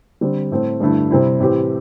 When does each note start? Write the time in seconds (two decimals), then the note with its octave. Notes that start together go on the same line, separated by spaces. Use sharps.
0.21 D3 G3 C4
0.51 A2 A3 C4
0.80 G2 D3 A3 E4
1.10 C3 G3 C4 E4
1.39 A2 E3 C4 G4